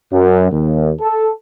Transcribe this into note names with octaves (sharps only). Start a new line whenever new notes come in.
F#2
D#2
A4